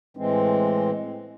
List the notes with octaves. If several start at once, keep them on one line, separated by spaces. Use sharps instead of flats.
A2 E3 G#3 C4